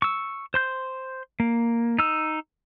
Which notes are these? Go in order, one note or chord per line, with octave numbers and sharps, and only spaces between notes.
C#6 E6
C5 C6 G6
A#3
D#4 E6